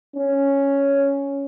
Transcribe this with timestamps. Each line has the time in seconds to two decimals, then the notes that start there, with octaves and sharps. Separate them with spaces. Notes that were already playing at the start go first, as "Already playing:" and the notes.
0.16 C#4